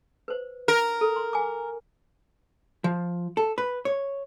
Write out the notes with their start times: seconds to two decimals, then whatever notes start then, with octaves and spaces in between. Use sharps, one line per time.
0.28 B4 C5
0.68 A#4
1.01 A4
1.16 C6
1.33 F#5 G#5 D6
2.84 F3
3.37 A4
3.58 B4
3.85 C#5